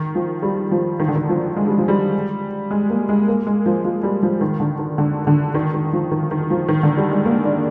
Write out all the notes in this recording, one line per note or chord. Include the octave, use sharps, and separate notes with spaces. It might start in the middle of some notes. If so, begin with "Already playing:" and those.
Already playing: D#3
F3
G3
F3
D#3
D3
D#3
F3
G#3
G3
F3
G3
G#3
A#3
G#3
A#3
G#3
F3
F3
G3
F3
D#3
D3
D#3
D3
D3
D#3
D#3
F3
D#3
D#3
F3
D#3
D3
G3
G#3
A#3
D4